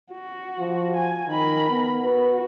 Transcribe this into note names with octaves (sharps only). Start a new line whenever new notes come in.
F#4
F3
G#5
D#3 A#4 B5
B3
F#4 B4